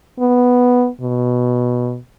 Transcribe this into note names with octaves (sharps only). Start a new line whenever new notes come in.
B3
B2